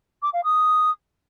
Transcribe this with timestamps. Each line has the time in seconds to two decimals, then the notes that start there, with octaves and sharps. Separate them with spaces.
0.22 D6
0.33 F5
0.44 D#6